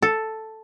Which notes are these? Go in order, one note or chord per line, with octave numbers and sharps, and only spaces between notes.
A4